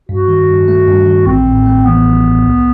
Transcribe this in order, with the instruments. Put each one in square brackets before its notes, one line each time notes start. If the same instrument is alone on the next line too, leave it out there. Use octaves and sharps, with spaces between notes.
[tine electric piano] G2 [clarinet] F#4
[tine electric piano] D#3
G2
A3
G2
D#3
[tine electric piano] A1 [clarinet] C4
[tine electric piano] A2
A3
[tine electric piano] E3 [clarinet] B3
[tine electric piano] A1
A2
C2